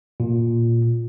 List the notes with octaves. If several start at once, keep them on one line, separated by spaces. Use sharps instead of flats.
A#2